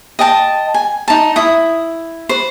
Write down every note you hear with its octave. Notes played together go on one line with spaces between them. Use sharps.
D#5 G5 A5
G#5
D#4 A5
E4 D#6
B4 C5